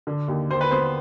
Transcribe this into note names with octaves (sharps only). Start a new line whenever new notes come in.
D3
D#2
D#2 C5
B4
B3 C5